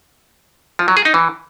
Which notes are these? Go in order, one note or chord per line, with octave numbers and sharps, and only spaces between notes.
F3
F#3
G#4
D#4
E3